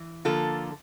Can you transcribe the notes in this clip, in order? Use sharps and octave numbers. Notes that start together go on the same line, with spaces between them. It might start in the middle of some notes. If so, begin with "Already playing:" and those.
Already playing: E3
D3 F3 A#3 F4 A4